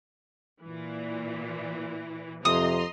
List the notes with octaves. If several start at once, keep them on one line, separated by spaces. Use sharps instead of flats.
A#2 E3
F2 C3 D#5 A#5 C6 D#6